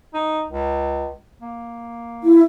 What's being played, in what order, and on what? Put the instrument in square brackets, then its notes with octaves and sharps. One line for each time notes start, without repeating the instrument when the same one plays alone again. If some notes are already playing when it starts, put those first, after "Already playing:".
[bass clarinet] D#4
C#2
A#3
[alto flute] E4